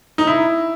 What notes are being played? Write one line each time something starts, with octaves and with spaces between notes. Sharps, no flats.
D#4
E4